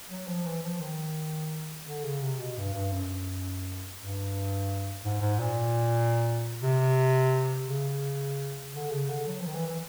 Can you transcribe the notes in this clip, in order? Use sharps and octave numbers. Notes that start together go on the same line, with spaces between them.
F#3
F3
E3
F3
D#3
D3
C#3
C3
B2
G2
G2
F#2
G2
G#2
G#2
A#2
C3
C#3
D3
C#3
D3
F#3
F3
D#3
E3
E3